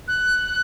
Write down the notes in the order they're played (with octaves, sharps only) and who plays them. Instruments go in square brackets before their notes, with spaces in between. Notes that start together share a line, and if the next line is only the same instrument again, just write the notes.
[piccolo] F#6